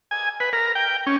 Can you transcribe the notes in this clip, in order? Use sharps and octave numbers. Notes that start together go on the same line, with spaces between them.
G#5
B4
A#4
G5
C#4